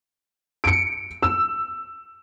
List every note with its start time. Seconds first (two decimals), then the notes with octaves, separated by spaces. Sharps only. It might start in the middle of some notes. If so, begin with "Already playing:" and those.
0.64 C#7 D7
1.23 E6